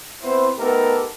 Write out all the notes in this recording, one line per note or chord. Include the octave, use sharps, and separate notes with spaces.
B3 C4 E4 B4 C5
A3 B3 D#4 G4 A4 A#4